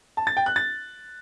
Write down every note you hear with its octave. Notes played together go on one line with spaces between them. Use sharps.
A5
A6
G5
F#6
A6